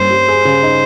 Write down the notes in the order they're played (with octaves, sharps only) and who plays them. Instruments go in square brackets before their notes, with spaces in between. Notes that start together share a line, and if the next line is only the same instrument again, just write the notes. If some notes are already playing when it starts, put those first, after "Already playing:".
Already playing: [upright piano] G2 A#3 C#4 [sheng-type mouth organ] C5
[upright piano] G3
G#4
C#3
D#4